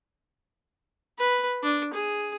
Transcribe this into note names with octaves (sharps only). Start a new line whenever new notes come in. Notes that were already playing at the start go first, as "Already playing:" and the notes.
B4
D4
G#4